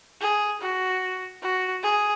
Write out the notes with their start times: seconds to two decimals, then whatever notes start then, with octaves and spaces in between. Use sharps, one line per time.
0.21 G#4
0.61 F#4
1.42 F#4
1.83 G#4